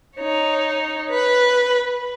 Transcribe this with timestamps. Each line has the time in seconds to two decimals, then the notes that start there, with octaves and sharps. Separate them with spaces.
0.17 D#4 C#5
1.09 B4